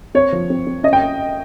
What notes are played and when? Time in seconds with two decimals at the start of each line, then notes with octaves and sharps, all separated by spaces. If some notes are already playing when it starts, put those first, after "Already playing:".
0.15 C4 C#5
0.33 F3
0.50 C4
0.67 C4
0.83 C#4 D#5
0.93 G5